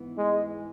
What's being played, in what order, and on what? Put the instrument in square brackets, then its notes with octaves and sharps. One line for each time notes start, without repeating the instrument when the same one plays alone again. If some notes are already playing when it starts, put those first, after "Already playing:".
Already playing: [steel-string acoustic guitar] G#2 E3 B3
[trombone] G#3